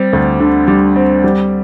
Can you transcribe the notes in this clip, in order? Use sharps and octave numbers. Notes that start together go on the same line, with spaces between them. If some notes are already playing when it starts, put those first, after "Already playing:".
Already playing: G3 C4
D2
D3
G3
C4
G3